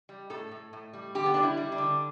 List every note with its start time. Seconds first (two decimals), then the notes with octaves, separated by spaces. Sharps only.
0.09 G3
0.30 A2 A4
0.51 A2
0.73 A2
0.93 G3
1.15 D3 G4
1.26 B3
1.34 G3 D4
1.43 E4
1.57 G3
1.72 D4
1.78 D3